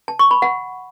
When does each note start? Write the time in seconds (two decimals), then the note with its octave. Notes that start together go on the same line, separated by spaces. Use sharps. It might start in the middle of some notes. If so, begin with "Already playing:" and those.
0.08 A5
0.19 C#6
0.31 B5
0.42 F#5